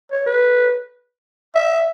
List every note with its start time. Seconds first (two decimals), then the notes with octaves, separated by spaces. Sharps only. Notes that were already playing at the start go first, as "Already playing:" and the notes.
0.12 C#5
0.26 B4
1.55 E5